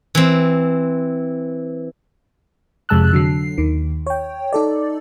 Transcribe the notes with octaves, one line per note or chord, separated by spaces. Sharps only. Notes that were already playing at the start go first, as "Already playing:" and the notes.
E3 C4
F2 C3 G#3 A5 E6 F#6
D3 F#3 C7
D#2 D#3
C#5 G5
D#4 A4 D5